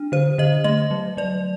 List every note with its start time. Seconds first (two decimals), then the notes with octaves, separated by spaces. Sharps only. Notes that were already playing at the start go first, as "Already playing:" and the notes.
Already playing: D4
0.12 D3 C5
0.38 D3 D#5
0.64 A3 D#5
0.91 F#3
1.17 F#3 D5